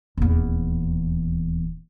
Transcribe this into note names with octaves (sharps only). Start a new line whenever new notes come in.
D#1 E2